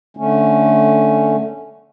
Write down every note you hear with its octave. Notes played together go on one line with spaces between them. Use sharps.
D3 A3 C#4